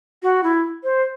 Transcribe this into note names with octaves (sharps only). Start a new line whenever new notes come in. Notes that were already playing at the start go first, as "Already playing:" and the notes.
F#4
E4
C5